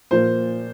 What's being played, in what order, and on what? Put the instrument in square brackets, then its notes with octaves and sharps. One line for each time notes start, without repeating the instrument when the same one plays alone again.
[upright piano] A#2 F3 A#3 C5